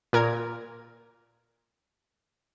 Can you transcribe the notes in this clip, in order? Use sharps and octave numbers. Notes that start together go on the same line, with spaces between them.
A#2 A#4 G#6